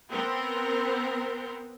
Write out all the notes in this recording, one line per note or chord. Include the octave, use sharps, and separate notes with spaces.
B3 C4 A#4